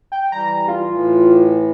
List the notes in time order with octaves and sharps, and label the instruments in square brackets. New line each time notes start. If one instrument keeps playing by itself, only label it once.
[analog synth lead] G5
[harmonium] E3 G3 [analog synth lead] A#5
[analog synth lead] F4
[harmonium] A2 E3